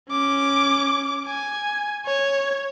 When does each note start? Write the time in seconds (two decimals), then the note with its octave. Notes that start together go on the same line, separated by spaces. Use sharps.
0.10 C#4 D6
1.27 G#5
2.06 C#5